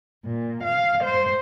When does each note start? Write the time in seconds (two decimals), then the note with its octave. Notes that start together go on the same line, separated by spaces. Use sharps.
0.24 A#2
0.63 F5
1.02 C5